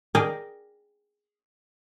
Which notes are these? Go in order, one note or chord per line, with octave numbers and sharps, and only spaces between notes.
G#4 A#4 D5 G5 G#5